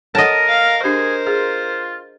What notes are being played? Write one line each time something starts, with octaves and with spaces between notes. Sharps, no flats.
A4 A#4 C#5 D#5 F#5 A5
F5
D4 G4 G#4 A#4 C5
F4 G#4